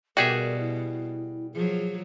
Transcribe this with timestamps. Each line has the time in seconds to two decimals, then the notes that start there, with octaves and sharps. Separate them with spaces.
0.17 B2 G3 F#4 G#4 A#4 D5 E5 G5
0.59 E4
1.54 F3 F#3 G#4